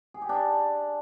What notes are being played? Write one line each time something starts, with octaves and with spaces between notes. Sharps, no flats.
G#4
G4
D4